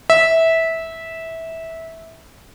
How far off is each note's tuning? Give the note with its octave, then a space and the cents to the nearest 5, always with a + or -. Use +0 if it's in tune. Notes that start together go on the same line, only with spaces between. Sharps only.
E5 -15